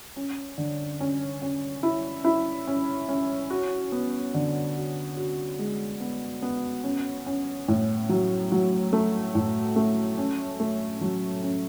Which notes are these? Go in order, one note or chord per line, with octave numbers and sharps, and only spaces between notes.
C#4
D3
C#4
C#4
E4
E4
C#4
C#4
F#4
B3
D3
F#4
F#4
G#3
B3
B3
C#4
C#4
A2
F#3
F#3
A3
A2
A3
C#4
A3
F#3
C#4